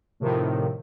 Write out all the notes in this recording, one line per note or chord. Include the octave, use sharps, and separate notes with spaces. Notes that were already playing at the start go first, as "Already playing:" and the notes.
A2 C3 D#3 F3